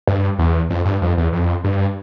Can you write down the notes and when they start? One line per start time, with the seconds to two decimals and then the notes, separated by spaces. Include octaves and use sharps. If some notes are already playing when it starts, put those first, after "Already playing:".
0.07 G2
0.39 E2
0.70 F2
0.85 G2
1.02 F2
1.17 E2
1.33 F2
1.64 G2